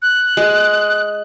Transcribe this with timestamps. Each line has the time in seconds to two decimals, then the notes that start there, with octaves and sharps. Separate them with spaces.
0.02 F#6
0.37 G#3